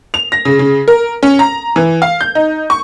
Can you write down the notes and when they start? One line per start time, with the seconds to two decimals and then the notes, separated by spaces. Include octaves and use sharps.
0.14 F7
0.32 A#6
0.45 C#3
0.59 C#3
0.88 A#4
1.23 C#4
1.39 A#5
1.76 E3
2.02 F5
2.21 G6
2.35 D#4
2.70 C#6